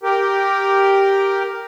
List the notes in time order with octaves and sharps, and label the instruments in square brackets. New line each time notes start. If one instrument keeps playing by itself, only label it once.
[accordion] G4 A#4